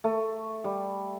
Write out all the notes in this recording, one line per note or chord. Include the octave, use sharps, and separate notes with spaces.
A3
G3